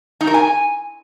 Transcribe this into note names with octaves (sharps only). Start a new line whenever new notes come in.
D#4
A#4
G#5